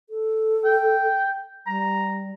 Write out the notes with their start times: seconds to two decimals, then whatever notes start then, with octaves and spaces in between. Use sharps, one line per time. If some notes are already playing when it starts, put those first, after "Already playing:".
0.10 A4
0.65 G5
1.67 G3 A#5